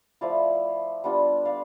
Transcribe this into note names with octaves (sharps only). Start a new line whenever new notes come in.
F3 A3 E4 D5 F5
G3 B3 D4 F4
D5 F5